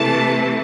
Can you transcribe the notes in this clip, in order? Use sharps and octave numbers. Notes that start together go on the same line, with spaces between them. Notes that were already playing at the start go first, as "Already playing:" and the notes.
Already playing: C3 E3 A3 A5